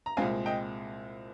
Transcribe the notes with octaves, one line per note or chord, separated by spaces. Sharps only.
A#5
C2 A#2 G#3 C4 F5 G#5
D#5 G5